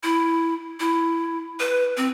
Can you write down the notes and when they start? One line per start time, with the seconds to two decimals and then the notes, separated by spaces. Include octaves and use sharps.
0.03 E4
0.80 E4
1.60 B4
1.97 C4